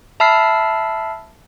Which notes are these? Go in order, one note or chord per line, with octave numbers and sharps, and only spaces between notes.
E5 A5 B5 E6 F6 C7